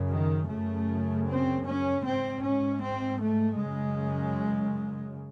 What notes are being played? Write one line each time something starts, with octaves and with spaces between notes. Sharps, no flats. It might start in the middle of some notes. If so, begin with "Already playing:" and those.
Already playing: F#2 C#3
D#3
F#2 C#3 A3
C4
C#4
G#2 C4
C#4
C4
A3
F#2 C#3 G#3